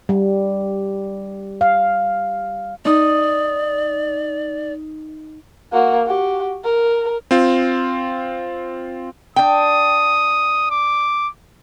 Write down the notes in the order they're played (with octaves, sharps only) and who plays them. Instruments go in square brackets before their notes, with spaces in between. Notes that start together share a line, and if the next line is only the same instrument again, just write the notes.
[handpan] G3
F5
[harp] D#4 D#6 [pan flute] D5
[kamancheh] A#3 F#4
F#4 G4
A#4
[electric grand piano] C4 F4
[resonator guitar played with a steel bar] D4 G5 [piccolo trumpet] D#6
[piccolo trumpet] D6